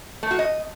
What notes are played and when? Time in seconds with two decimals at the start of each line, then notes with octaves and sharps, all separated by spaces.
0.23 A3
0.31 F#4
0.39 D#5